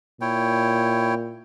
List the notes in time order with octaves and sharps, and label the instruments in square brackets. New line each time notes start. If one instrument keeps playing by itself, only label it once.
[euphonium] A#2 [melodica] E4 C#5 G5